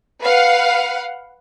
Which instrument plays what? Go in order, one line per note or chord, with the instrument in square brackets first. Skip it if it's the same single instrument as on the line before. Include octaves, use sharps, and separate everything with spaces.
[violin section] B4 F5 F#5